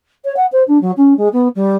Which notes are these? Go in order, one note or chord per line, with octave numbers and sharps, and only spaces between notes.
C#5
F#5
C5
D4
F#3
C#4
G#3
B3
G3